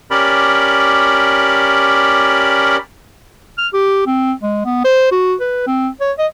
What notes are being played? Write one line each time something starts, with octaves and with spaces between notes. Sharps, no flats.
C#4 G4 A#4 D5 B5
F6
G4
C4
G#3
B3
C5
F#4
B4
C4
C#5
D#5